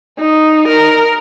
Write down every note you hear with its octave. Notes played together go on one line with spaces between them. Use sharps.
D#4
A#4